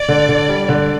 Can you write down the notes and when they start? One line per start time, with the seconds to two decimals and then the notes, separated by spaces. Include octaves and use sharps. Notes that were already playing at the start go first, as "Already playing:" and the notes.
Already playing: D5
0.09 D3
0.29 D3
0.49 G3
0.69 D3